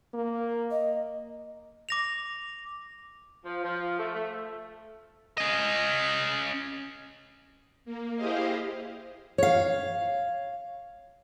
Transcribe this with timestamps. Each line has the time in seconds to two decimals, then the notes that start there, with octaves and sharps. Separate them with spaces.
0.14 A#3
0.71 D#5
1.89 D6 A#6 F7
3.45 F3
3.63 F3
3.99 A3
4.14 A3
5.38 C#4 D#5
7.85 A#3
8.16 E4 G4 G#4 C5 D#5 F5
9.38 C#5 F5